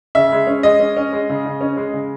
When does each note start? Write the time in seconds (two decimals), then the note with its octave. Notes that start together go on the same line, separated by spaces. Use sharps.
0.15 C#3 E5
0.32 G#3
0.47 C#4
0.63 G#3 D#5
0.80 C#4
0.97 C#4
1.13 G#3
1.30 C#3
1.45 C#3
1.61 C#4
1.77 G#3
1.94 C#3